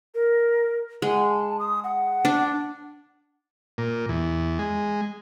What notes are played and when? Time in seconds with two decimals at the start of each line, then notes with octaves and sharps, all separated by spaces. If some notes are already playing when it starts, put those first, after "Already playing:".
0.15 A#4
1.02 G#3 F#5
1.30 A5
1.59 D#6
1.84 F#5
2.25 D4
3.78 A#2
4.09 E2
4.59 G#3